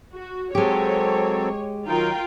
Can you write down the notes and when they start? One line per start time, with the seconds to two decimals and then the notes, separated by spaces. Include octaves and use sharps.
0.13 F#4
0.55 F#3 G#3 C4 G4 A4 C#5
1.86 D#3 F#3 D#4 F4 A#4 G5